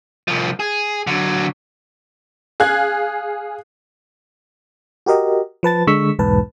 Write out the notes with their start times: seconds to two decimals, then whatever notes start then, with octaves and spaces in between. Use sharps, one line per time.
0.28 C2 F3
0.60 G#4
1.07 D3 F#3
2.60 G#4 F5 F#6 G#6
5.06 F#4 G4 A#4 D#5
5.63 F3 B4 A5 A6
5.87 D3 G#3 C#6 E6 B6
6.19 B1 E2 G#2 B4 A5